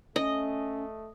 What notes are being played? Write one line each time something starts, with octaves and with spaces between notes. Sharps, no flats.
A3 C#4 D#5